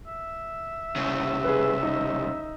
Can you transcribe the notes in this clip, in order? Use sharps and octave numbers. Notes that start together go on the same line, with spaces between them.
E5
C2 C#3
G#4 B4
D#4